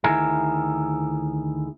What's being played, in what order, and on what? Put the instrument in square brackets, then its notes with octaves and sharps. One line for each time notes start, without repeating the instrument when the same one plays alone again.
[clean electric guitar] D2 D#3 E4 G#4 A#4